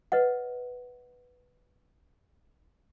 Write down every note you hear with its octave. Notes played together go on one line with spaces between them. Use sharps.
B4 C#5 D#5 F#5